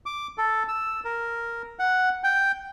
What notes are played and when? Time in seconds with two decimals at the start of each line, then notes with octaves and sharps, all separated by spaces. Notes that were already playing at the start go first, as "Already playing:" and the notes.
0.06 D6
0.38 A4
0.68 E6
1.05 A#4
1.79 F#5
2.24 G5